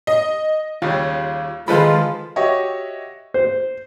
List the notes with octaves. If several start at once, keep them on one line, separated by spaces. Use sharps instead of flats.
D#5
D#2 C#3 G3 F4
D#3 F3 G#3 F4 A4 B4 C5 B5
F#4 G4 C#5 D#5 E5
C5